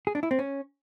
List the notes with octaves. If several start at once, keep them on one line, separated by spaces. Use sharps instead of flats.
G#4
D4
E4
C4
C#4